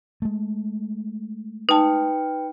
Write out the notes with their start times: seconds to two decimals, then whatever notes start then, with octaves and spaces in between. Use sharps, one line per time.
0.22 G#3 A3
1.69 D#4 B4 G5 A5